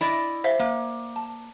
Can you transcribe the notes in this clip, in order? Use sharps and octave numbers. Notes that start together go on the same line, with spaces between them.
E4 D5 D#5
C5 E5 F5
A#3
A5